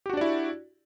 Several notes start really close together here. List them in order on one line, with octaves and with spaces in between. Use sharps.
G4 F#4 D4 D5 E4